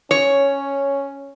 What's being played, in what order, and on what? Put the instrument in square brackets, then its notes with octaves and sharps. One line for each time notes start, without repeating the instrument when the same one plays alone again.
[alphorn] C#4 [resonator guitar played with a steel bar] C#5